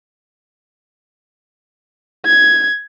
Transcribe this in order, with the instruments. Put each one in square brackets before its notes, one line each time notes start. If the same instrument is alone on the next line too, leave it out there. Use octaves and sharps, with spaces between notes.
[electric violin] G#6